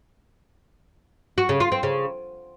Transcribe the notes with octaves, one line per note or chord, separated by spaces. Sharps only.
F#4
C#3
F4
C4
C#3